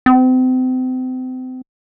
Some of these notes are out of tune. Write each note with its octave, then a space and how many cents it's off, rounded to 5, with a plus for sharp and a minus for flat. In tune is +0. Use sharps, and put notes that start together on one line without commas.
C4 -35